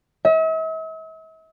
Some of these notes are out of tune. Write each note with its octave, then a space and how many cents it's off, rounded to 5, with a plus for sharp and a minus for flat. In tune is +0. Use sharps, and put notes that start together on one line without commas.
E5 -45